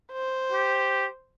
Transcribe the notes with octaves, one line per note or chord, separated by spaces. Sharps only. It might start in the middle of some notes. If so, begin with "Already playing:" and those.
C5
G4